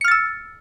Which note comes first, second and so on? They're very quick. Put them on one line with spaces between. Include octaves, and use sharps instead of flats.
C#7 F6 A6 E6